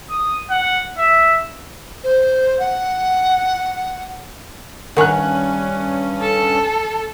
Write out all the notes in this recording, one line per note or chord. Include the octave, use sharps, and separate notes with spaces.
D#6
F#5
E5
C5
F#5
G2 D#3 C#4 C#5 F#5 G#5 F#6
A4